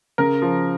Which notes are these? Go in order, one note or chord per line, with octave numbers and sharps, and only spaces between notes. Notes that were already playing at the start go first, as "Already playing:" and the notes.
C#3 A#4
F3